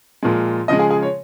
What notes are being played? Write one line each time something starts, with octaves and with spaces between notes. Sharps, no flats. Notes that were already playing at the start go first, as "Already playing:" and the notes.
A#2 F3 G#3
C#3 F3 G#3 D#5
G#4
G#4
C#5